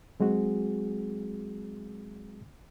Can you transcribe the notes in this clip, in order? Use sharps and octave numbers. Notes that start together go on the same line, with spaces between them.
F#3 G#3 C4 F#4 G#4